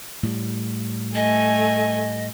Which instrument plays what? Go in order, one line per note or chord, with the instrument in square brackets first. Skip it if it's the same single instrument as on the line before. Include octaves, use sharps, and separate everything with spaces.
[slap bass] A2 G3
[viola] A3 G#5 [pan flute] D#5